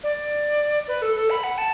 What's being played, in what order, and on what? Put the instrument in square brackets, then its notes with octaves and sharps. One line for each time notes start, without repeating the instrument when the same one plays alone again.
[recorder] D5
B4
A4
A4
B5
F#5
A5